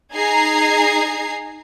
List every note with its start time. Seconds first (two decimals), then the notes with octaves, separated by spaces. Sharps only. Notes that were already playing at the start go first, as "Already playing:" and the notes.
0.14 D#4 G#4 A#5 G#6 C7